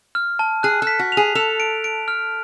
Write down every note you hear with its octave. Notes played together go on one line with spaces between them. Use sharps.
F6
A5
G#4 F#6
A4
B6
F#4
G#4 F7
A4 F7
D7
D7
F6